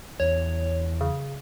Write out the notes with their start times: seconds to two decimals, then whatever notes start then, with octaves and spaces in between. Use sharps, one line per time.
0.20 E2 C#5
1.01 C#3